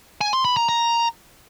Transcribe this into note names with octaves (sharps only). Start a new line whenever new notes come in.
G#5
C6
B5
A#5
A#5